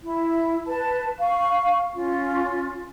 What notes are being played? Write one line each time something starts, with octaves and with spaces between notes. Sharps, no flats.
E4
B4 A5
F5 C#6
C#4 F4